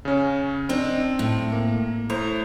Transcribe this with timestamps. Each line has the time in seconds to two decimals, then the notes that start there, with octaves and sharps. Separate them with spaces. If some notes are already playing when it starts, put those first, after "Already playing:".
0.05 C#3 C#4
0.69 C4 D4 D#4
1.19 A2
1.52 A#3
2.10 A2 C5 A#5